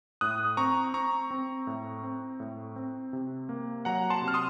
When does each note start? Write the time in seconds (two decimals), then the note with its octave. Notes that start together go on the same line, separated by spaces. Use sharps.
0.21 A2 D#6 F#6
0.57 C4 A#5 C#6
0.94 C4 A#5 C#6
1.31 C4
1.67 A2
2.03 C4
2.40 A2
2.76 C4
3.13 C3
3.49 A#3
3.85 F#3 F#5 A#5
4.10 A5 C6
4.22 C3
4.28 F6
4.34 C6 D#6